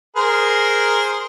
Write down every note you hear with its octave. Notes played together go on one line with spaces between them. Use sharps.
G#4 A#4 C5